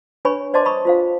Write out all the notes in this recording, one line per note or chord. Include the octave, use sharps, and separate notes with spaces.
D4 B4 C#5 G#5 B5 C#6
C5 D5 D#5 A5 C6 D6
A5 B5 C#6 D#6
F4 C5 F5